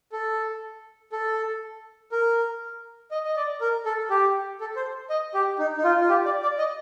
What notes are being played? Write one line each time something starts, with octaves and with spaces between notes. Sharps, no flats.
A4
A4
A#4
D#5
D#5
D5
A#4
A4
G4
A4
C5
D#5
G4
D#4
D#4
F4
F4
G4
D5
D5
D#5